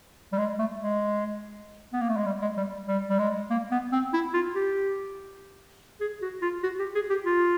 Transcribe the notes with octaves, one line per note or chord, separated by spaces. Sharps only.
G3
G#3
A3
G#3
B3
A#3
A3
G#3
G3
G#3
G3
G3
G3
G#3
A#3
B3
C4
E4
F4
G4
G#4
F#4
F4
F#4
G4
G#4
G4
F4